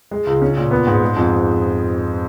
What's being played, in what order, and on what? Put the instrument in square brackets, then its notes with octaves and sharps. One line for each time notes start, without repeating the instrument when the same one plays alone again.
[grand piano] G#3
C#2
C#4
A#2
B3
G#2
G#3
F2